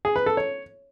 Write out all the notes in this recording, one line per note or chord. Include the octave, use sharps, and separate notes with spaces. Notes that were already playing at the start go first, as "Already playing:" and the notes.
G#4
B4
A4
C#5